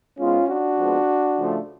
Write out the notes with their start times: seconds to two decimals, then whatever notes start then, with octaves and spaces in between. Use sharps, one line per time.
0.18 G#2 G#3 B3 C#4 F4
0.49 D4 F#4
0.78 F2 F3 G#3 B3
1.37 C#3 F3 A3